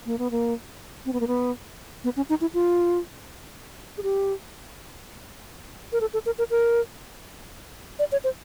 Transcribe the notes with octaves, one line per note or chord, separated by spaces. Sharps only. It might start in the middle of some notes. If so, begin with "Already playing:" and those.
A#3
B3
A#3
C4
B3
A#3
B3
B3
C#4
D#4
E4
F4
G#4
G4
A#4
A4
A4
A#4
A#4
A#4
D5
C#5
C5